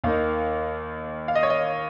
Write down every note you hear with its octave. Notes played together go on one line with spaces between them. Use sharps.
D#2 D#3 A#3 D#4 F5
F5
D#5
C#5
D#5